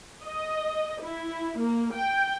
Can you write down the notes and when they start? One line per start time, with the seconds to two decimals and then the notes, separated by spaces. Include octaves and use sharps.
0.24 D#5
1.01 E4
1.58 A#3
1.94 G5